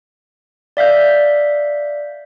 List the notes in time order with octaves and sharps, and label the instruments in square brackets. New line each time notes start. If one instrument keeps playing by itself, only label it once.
[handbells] D5 E5 F5 G6